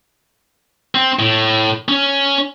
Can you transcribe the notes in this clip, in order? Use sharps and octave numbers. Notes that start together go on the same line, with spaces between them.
C4
A2
C#4